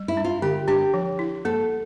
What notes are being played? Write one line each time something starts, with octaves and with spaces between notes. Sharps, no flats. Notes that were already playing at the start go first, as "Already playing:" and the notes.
Already playing: G3
E4
D4
F4
D3 G4
D4 G4
F3
E4
A#3 A4